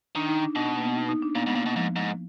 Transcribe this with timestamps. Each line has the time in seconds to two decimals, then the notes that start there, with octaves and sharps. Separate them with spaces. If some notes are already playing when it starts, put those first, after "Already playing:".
0.15 D#3 D4
0.29 D#4
0.43 D4
0.56 B2 D4
0.66 B3
0.76 A#3
0.85 B3
0.96 D#4
1.09 D#4
1.22 D4
1.35 A#2 B3
1.46 G#2
1.49 B3
1.55 A#2
1.63 B2 A#3
1.75 G#2 F3
1.96 G#2